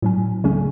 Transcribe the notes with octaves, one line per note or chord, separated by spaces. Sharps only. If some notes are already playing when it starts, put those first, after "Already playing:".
A2 F#3 C#4
C#2 C#3 F#3 A3 C#4